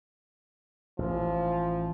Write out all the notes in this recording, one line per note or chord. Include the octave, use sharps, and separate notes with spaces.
A1 F3